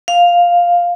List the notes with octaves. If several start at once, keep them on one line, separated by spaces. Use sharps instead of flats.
F5